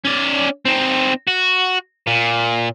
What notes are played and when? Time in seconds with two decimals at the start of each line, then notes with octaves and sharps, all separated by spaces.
0.05 C#4 D5
0.65 C4 D#4
1.28 F#4
2.07 A#2